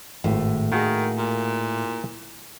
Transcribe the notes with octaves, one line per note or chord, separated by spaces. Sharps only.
G#1 A2
D#3 A#3 F#4 G#4
A#2